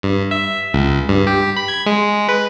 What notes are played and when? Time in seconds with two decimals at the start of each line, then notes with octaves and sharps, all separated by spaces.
0.03 G2
0.31 E5
0.74 C#2
1.09 G2
1.27 G4
1.56 B5
1.68 G#6
1.86 G#3
2.29 B4